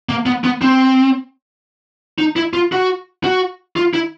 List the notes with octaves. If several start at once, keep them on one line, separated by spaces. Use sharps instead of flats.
A#3
B3
B3
C4
D#4
E4
F4
F#4
F#4
F4
E4